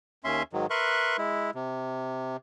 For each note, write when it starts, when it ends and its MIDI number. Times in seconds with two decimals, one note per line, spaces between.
0.24 0.43 39
0.24 0.43 61
0.24 0.43 76
0.24 0.43 84
0.53 0.66 44
0.53 0.66 51
0.53 0.66 54
0.70 1.17 70
0.70 1.17 71
0.70 1.17 76
0.70 1.17 84
0.70 1.17 85
0.70 1.17 90
1.18 1.51 56
1.18 1.51 64
1.55 2.37 48